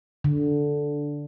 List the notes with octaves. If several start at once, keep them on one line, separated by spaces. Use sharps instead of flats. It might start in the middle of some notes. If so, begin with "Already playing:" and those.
D3